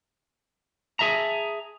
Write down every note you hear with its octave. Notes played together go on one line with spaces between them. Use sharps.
G#4 A4 E5 A5 A#5